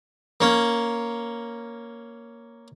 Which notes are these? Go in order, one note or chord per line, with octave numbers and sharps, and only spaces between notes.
A#3 C#4